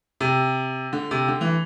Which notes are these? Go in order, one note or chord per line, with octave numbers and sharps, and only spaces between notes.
C3
D3
C3
D3
E3